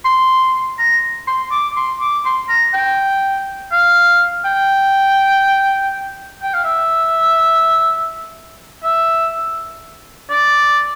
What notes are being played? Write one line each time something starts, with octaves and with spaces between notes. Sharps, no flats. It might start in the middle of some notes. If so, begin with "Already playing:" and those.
C6
A#5
C6
D6
C6
D6
C6
A#5
G5
F5
G5
G5
F5
E5
E5
D5